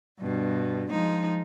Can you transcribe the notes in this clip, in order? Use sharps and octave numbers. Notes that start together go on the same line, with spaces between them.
G2 B2
F3 G#3 D#4